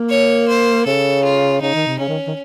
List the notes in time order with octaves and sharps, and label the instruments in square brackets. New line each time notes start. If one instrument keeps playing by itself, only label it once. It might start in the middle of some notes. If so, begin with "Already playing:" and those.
Already playing: [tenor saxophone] A#3
[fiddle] C#5
C5
[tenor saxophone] C#3 [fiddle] A4
[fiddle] F4
[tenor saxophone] C#3 [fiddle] D#4
[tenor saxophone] D#3
C3
[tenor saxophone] C#3 [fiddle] C#4
[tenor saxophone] D#3
D#3